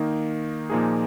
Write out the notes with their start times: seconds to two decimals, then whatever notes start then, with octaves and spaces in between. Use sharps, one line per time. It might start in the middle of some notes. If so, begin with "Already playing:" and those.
Already playing: D#3 A#3 D#4
0.70 A#2 F3 A#3 D#4 G#4